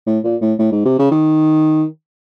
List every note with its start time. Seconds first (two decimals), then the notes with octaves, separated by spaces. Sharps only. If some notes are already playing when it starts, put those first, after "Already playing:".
0.07 A2
0.24 A#2
0.42 A2
0.59 A2
0.72 G#2
0.85 C3
0.99 C#3
1.11 D#3